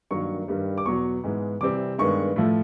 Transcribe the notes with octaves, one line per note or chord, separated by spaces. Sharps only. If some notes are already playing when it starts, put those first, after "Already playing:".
G2 D#3 F#3 A#3 C#6
G2 D#3 G3
D6
E2 B2 F#3 C#6
G#2 E3 G#3 B3
C3 E3 G3 C4 D6
G2 D#3 G#3 B3 C#6
A2 F3 A3